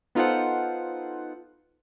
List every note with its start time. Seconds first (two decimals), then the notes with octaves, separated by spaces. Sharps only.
0.15 B3 D#4 F4 A4 C5 F#5